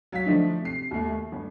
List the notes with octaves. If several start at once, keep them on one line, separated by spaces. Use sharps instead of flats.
F#3 F5 B6
D3 F3 A3 D4 D#4
C3 C7
D#2 A3
A3
G1